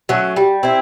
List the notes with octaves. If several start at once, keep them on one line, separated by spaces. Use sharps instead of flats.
F#3 A3 C#4
G3
C4 E4